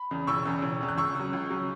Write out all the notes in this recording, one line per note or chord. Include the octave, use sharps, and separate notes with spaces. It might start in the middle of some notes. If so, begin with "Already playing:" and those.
Already playing: B5
E2 C#3
E1 C#6 E6
E2 C#3
E1
E2 C#3
F#6
C#2 C#6 E6
C#3 F#3
C#2
C#3 F#3